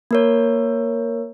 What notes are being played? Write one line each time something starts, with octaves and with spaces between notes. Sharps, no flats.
A#3 A#4 C#5